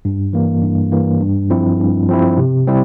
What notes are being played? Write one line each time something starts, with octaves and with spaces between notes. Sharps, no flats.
G2
E3 A#3
G2
E3 A#3
G2
F3 C4 E4
G2
F3 C4 E4
C3
G3 C4 E4